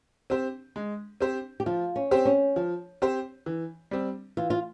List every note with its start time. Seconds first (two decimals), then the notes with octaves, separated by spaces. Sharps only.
0.30 C4 G4 C5
0.76 G#3
1.21 C4 G4 C5
1.60 G4
1.66 F3 F4
1.96 C#4
2.11 C4 G4 C5
2.25 C#4
2.56 F3
3.02 C4 G4 C5
3.46 E3
3.91 G3 C4
4.37 E3 F4
4.50 F4